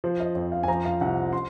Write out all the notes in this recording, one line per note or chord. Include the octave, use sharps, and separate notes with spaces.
F3 C5
D#5
F2
F5
G#5
F3 A#5
F5
C2 F#5
C6